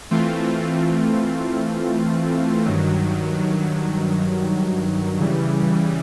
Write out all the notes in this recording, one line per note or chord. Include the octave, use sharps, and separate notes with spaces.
E3 A3 C4 F4
G2 D#3 F#3
C#3 E3 G3